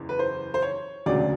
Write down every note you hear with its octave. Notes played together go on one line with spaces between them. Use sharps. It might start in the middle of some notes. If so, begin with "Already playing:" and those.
Already playing: F#1 E2
B4
C5
C5
C#5
E1 D2 C#3 F#3 D5